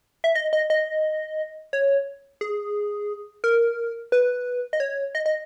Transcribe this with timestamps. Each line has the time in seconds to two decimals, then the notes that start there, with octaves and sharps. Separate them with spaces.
0.24 E5
0.35 D#5
0.53 D#5
0.70 D#5
1.73 C#5
2.41 G#4
3.44 A#4
4.12 B4
4.73 D#5
4.80 C#5
5.15 D#5
5.26 D#5